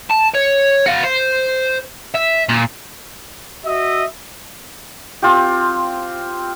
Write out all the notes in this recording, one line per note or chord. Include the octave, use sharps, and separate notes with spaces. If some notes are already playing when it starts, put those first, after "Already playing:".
A5
C#5
F#4 F5
C5
E5
A#2
F#4 D#5 E5
C4 F4 G4